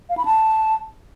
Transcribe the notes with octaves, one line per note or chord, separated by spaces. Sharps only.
F5
B5
A5